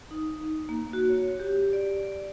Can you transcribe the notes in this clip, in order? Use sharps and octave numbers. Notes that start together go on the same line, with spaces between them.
D#4
A#3
F#4
C#5
G4
D5